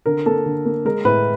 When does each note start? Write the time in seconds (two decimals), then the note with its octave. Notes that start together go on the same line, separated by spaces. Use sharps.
0.06 D3 A#4
0.26 A#3 A4
0.46 D3
0.66 A#3
0.85 G#3 A#4
1.05 A2 B4